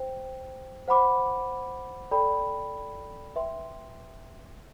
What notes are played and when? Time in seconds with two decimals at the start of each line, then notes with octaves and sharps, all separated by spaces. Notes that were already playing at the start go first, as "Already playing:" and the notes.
Already playing: C5 G5
0.88 C5 F#5 B5 D6
2.11 A4 D5 G5 B5
3.36 B4 E5 G5 C6